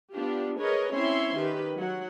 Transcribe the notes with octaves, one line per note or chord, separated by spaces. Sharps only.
B3 D4 F4 G4
G#4 A#4 B4 C#5 D#5
C4 C#4 E4 C#5 E5 C6
D#3 G4 B4
F#3 F#5